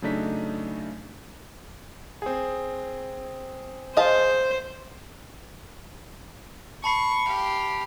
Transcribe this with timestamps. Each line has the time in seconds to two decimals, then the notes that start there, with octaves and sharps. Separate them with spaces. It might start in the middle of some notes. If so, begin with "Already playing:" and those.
0.02 C#3 F#3 A3 D4 D#4 B6
2.22 C4 G#4
3.97 G#4 C5 D#5 F5 A5
6.84 A5 B5 C#6 C7
7.28 G4 F5